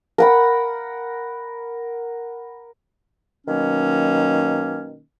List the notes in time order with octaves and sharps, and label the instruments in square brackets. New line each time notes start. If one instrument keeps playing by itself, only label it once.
[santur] A#4 F#5 B5
[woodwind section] B2 D#3 F#3 A#3 C#4